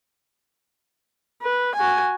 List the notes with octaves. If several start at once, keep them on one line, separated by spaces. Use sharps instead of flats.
B4
F#4 G#5